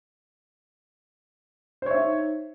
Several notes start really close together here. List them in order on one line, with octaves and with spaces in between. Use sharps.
C5 C#5 E5 D#4